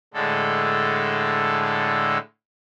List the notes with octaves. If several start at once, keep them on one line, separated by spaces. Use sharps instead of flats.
A2 D3 G#3 A4